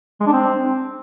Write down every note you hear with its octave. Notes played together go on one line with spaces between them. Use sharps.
G#3
D4
C4